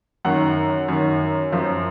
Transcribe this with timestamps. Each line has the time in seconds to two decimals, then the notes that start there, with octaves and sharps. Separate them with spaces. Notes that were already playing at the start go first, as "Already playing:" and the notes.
0.25 F#2 D#3 F#5
0.88 F#2 D#3
1.52 F#2 F3